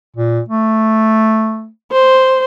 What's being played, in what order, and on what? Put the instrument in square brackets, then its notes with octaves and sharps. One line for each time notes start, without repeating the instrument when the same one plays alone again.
[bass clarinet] A#2
A3
[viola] C5